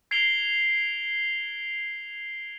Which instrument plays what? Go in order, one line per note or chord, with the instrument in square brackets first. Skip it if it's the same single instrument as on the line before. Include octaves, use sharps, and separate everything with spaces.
[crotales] G#6 C7 D7 F7 G7